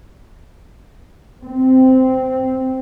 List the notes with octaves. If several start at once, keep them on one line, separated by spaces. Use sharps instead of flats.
C4